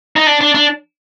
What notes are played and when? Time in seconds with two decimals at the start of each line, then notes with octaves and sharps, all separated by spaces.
0.16 D#4
0.27 D4
0.41 D4
0.55 D4